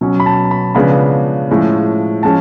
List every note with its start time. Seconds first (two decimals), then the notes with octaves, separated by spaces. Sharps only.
0.01 B2 F#3 C#4
0.20 B5
0.26 A5
0.51 B5
0.75 C#3 F3 G#3 B3 D4 B5
1.49 A2 F3 G#3 C#4
2.23 F3 G#3 C#4 A5